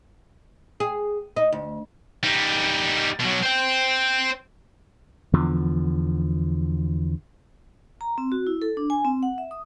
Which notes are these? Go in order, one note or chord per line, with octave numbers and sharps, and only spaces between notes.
G#4
D#4
D2
G3 D#4
B2 F#3
C5 G5
E2 D3 F3
A#5
C4
F#4
E4
A4
D4
G#5
C4
F#5
E5
D#6